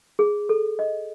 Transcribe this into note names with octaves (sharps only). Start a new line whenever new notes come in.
G#4
A4
D#5